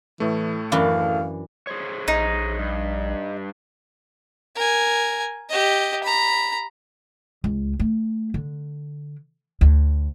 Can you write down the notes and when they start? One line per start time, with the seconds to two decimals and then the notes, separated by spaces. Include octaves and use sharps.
0.20 A2 E3 A3
0.72 F#2 E3 D4 F5
1.67 G#4 C5 C#5
2.08 A#1 D#4
2.59 G2
4.56 A#4 G#5
5.49 G4 D#5
6.03 A#5 B5
7.44 C#2
7.79 A3
8.34 D3
9.61 D2